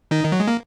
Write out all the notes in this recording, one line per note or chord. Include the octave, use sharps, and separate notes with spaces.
D#3 D#4
D#3
F#3
G#3
A#3